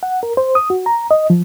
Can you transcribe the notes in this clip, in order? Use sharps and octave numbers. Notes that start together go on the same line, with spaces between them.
F#5
A#4
C5
D#6
F#4
A#5
D#5
F3